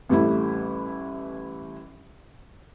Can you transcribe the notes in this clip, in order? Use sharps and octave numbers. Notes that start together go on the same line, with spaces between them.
A1 G3 A3 E4